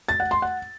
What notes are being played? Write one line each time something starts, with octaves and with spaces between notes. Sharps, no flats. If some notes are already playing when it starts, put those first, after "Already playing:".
A6
F#5
C6
F#5